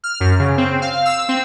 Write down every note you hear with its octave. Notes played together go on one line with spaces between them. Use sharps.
F6
F#2
C#3
C4
F5
E6
C4